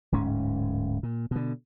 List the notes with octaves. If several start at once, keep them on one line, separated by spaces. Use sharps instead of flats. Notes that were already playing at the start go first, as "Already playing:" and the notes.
D1 G#2 C#4
A#2
B2 D3